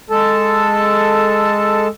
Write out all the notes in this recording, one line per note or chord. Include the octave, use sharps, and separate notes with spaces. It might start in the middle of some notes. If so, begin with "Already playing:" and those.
G#3 A4 A5